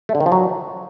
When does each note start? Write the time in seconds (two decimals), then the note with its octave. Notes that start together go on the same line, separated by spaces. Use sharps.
0.09 A3
0.15 D3
0.20 D#3
0.26 F3
0.32 F#3